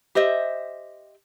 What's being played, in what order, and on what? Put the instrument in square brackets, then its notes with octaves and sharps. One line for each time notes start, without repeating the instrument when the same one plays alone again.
[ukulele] G4 C5 D#5 E5